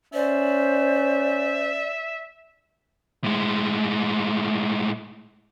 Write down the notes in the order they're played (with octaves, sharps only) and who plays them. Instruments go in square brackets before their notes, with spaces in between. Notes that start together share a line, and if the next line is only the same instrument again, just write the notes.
[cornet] C#4 [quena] C5 [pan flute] D5 [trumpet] E5
[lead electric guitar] A2 G#3